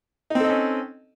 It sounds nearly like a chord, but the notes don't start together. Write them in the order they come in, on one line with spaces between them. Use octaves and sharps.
D#4 C4 A4 D#5 C#4